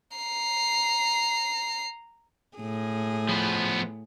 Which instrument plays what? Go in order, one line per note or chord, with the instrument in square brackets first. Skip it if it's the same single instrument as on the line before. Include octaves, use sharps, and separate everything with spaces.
[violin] A#5 C7
[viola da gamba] A2 G#4
[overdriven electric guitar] F3 B3